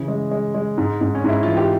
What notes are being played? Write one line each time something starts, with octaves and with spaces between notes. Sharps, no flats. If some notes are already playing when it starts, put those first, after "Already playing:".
Already playing: C#3 E3
G#3
G#3
G#3
G#2
G#2
C#4
G#2 E4
E3 F4
G4